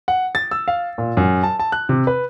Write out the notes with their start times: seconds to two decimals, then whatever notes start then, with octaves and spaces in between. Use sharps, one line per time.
0.08 F#5
0.35 A6
0.51 E6
0.68 F5
0.98 A#2
1.17 F#2
1.43 A5
1.60 A5
1.72 F#6
1.89 C3
2.07 B4